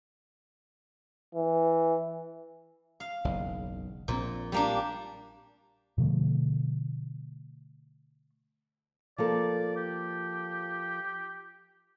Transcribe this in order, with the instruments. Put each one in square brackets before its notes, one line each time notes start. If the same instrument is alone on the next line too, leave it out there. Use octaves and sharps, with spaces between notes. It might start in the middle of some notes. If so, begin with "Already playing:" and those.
[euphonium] E3
[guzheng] F5
[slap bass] F#1 B1 E2
[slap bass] A#1 C4 [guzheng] A#2
[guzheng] G3 A#3 D4
[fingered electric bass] B2 D3 F3 A3
[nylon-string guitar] F3 A#3 A4 [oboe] D5
[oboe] G4